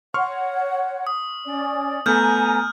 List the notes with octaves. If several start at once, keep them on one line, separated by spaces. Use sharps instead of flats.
C#5 F#5 C6 C#6 F6
D#6
C#4 D5
A3 B3 A4 G#5 A#5 F6 G6